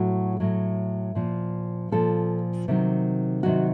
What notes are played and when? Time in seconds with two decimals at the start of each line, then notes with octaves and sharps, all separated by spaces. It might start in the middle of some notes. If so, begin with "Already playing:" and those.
Already playing: A2 F#3 F#4
0.40 A2 F#3
1.15 A#2 F3
1.91 A#2 F3 A4
2.68 C3 D#3 F#3
3.43 C3 D#3 F#3 F#4